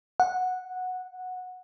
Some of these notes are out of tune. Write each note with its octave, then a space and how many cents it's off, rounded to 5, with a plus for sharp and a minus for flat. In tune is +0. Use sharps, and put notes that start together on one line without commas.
F#5 -10